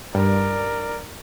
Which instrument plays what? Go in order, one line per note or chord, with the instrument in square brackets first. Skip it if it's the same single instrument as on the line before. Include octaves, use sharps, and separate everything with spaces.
[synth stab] G2 [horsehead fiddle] A#4 D5